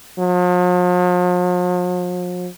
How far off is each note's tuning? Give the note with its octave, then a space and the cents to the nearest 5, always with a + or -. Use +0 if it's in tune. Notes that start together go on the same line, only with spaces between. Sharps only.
F3 +45